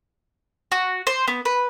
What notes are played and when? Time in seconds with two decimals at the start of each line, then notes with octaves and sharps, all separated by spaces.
0.72 F#4
1.07 C5
1.28 B3
1.45 B4